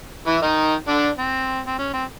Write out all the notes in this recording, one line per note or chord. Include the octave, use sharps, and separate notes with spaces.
E3 E4
D#3 D#4
D3 D4
C4
C4
C#4
C4